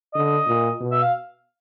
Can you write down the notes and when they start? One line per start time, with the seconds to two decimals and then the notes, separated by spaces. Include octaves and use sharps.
0.14 D3 D#5
0.47 A#2
0.80 B2
0.92 E5
1.02 F5